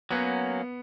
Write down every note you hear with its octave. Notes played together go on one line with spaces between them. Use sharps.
F#3 A#3 B3 C#4